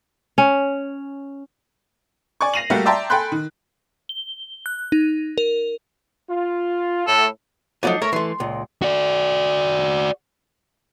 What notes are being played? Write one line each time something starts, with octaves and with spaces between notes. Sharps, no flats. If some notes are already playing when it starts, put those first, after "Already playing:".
C#4
D5 G#5 C#6
A#6 C7 D#7 F7 F#7
G3 A3 A#3 F#4 G4 F5
D5 E5 G5 A5 A#5 C6
A4 G5 G#5 B5 C6 F#6
D#3
G7
F#6
D#4
A#4
F4
A2 A4
F3 F#3 A3 B3 D4 D#4
A3 A#4 C#5 E5
E3 A3 C6
C#2 A#2
F#4 D5